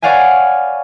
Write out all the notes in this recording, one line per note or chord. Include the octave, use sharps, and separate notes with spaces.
B4 C#5 D5 F5 F#5 G#5